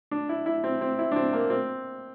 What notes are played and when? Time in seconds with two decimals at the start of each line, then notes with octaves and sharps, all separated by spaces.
0.11 D4
0.29 E4
0.46 E4
0.64 C4
0.81 C4
0.99 E4
1.12 D4
1.16 C4
1.33 A#3
1.50 C4